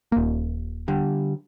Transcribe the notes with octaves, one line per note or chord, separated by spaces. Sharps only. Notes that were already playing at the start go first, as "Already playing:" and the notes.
D#1 A#3
D3 G3